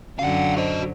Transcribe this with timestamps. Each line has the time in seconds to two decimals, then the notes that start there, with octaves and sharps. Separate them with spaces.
0.19 F#2 D3 F#3 C#4 F5 F#5
0.57 F#4 C5 D#5